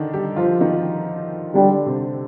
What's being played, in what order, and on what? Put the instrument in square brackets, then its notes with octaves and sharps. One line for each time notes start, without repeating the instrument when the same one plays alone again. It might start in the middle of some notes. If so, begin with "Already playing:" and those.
Already playing: [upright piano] D3 D#3 D4 D#4
G3 G4
F3 F4
D#3 D#4
[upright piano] D3 D4 [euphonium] G3
[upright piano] C3 C4